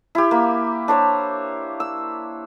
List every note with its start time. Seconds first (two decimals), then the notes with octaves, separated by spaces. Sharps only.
0.15 E4 G4
0.31 A#3
0.88 D4 C5 C#5
1.80 E6